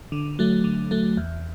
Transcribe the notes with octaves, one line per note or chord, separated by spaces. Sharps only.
D3
F#3 A3
D3
F#3 A3
E2